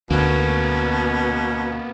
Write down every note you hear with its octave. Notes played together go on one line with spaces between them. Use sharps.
D2 B2 A#3 B3 C#4